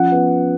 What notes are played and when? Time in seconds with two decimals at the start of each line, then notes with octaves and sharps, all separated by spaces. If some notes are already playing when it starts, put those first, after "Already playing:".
Already playing: F3 C#4 F#5
0.12 B3